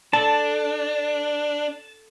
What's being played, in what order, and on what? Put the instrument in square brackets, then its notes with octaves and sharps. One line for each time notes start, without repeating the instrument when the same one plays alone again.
[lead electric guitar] D4 [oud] A4 [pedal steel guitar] A5